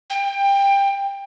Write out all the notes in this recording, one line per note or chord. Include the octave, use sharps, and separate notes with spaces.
G5